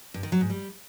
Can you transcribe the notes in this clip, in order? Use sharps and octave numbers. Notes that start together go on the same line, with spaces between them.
G2
D#3
F#3
G#2
G3